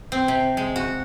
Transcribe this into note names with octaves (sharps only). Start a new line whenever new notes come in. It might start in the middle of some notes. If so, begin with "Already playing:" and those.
C4
C3
G#3
F#4